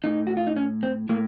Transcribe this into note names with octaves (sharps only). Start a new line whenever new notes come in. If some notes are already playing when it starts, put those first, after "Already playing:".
A2 D#4
F#4
F4
D#4
C#4
C4
A2 A#3